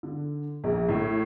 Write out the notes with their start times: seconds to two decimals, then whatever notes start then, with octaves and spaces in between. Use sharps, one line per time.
0.03 D3
0.64 A#1
0.89 A2